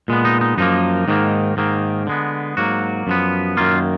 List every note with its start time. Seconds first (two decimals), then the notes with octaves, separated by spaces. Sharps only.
0.08 A#2 G#3 B3
0.25 D#4
0.41 D#4
0.58 F#2 F3 A#3 D#4
1.08 G#2 D#3 A#3
1.57 G#2 D#3 A#3
2.07 D3 G#3 B3
2.57 G#2 F#3 A#3 F#4
3.07 F#2 F3 B3
3.57 F#2 D#3 A#3 F4